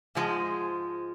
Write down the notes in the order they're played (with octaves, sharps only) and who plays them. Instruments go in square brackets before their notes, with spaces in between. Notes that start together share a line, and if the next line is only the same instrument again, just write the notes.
[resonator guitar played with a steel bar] G#2 F3 G#3